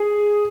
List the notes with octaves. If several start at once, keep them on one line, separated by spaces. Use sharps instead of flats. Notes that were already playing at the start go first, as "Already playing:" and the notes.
Already playing: G#4